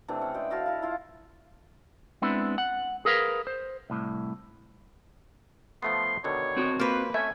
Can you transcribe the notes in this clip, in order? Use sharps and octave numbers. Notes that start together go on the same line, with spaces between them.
C3 E3 A3 D4
C#4 F#5
G#3 G4 D5 G5
E4 F#4 F5 A5
E4 F5
E4 F4
G#3 B3 C4 D4 E4
F#5
G#4 A#4 B4 F5
C5
C2 A2
F3 A3 B3 C6
B2 D3 D#3 C#5
C4 F#4
A#3 F4 B4 C5
A3 C#4 E5 G#5